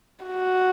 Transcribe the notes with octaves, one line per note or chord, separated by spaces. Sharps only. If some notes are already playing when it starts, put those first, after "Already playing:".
F#4